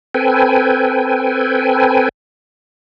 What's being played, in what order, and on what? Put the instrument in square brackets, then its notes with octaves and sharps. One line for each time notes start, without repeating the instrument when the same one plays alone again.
[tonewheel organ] C4 A4 B4 G5 G#5